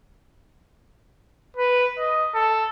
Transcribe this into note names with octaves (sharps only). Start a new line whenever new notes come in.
B4
D#5
A4